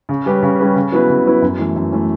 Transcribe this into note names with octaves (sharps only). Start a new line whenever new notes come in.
C#3
G3 C#4 G4 B4
C#3
G3 C#4 G4 B4
C#3
F#3 B3 E4 B4
C#3
F#3 B3 E4 B4
F#2
E3 A3
F#2
E3 A3